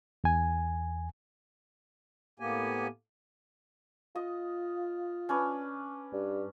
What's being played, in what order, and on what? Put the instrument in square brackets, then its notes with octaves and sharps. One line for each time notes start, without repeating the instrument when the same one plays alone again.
[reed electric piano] E2 G#5
[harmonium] A2 A#3 B3 G4 G#5
[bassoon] F4 [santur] D#5
[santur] C#4 D4 B4
[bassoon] G2